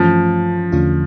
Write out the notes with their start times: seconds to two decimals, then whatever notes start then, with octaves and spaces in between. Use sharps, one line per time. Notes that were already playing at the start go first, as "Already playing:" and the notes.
Already playing: G2 E3 F3 A3 C#4
0.72 E2 D3 A3 C#4 F4